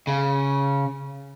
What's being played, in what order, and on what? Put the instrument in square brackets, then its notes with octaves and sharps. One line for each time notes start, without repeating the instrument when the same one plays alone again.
[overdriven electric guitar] C#3